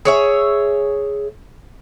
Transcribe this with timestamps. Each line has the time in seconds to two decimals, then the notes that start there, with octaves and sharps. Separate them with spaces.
0.05 G#4 C#5 E5